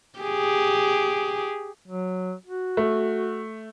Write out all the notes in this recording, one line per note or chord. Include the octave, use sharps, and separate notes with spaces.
G4 G#4
F#3
F#4
A3